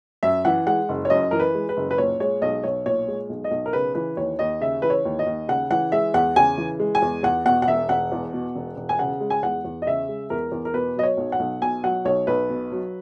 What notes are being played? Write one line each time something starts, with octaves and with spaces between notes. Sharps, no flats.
F#2 E5
E3 F#5
G#3 F#5
F#1
C#5
F#2 D#5
E3 A#4
B4
G#3
B4
F#1
B4
A#2 C#5
G#3 C#5
B1 D#5
B1 C#5
A#2 C#5
G#3
B1
D#5
B1
A#4
C#3 B4
E3 B4
D#2 C#5
D#2 D#5
C#3 E5
E3 B4
C#5
D#2
D#5
D#2
C#3 F#5
E3 F#5
G#3 E5
E2 F#5
C#3 G#5
E3
G#3
G#5
E2
E2 F#5
B2 F#5
F#5
E1 E5
E1 F#5
E2
B2
E1
E1
G#5
C#3 F#5
G#3
G#5
E2 F#5
E2
D#5
C#3 E5
G#3
E2 A#4
E2
A#4
B2 B4
F#3 D#5
C#5
B1
F#5
B1
B2 G#5
F#3 F#5
B1 C#5
B1 B4
B2
F#3